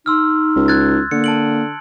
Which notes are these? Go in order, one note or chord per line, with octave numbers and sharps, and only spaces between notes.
D#4 C6 E6 F6
C#2
F#6 G#6 A6
D3 A#3 C#7
A5 D7 F#7